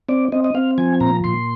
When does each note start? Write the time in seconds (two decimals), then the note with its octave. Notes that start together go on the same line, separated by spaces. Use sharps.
0.09 C4 D5
0.32 C4 D#5
0.44 D#5
0.54 C4 F5
0.78 F3 G#5
1.00 A#2 A#5
1.24 A#2 C6